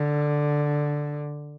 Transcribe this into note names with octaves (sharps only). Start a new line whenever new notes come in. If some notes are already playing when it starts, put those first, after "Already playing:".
Already playing: D3